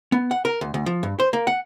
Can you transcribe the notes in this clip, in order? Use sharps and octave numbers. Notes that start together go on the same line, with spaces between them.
B3
F#5
A#4
D2
D2
F3
G2
C5
A#3
F#5